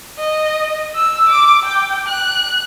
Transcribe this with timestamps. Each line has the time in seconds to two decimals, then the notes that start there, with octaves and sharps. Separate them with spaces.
0.18 D#5
0.95 E6
1.29 D6
1.65 G5
2.08 F#6